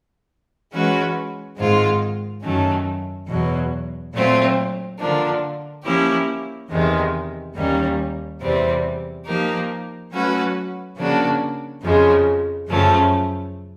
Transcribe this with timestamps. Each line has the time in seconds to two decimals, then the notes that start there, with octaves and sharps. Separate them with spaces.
0.71 E3 G#3 C#4 F#4 B4
1.57 G#2 D#3 G#3 C4 F4
2.42 F#2 D#3 F#3 A3 C#4
3.27 E2 B2 F#3
4.13 A#2 F#3 A3 C4 F4
4.99 D3 F3 A#3 D4
5.83 F3 A#3 C#4 E4 G4
6.69 E2 C3 D#3 G#3
7.55 D#2 D#3 G3 A#3 C#4
8.40 E2 C3 E3 G3 C4
9.25 F3 A#3 D#4 G4 A#4
10.11 F#3 A3 C#4 F#4 B4
10.96 C#3 F3 A#3 D4 F#4
11.82 F2 C#3 F3 G#3
12.67 F#2 C#3 F3 A3 C#4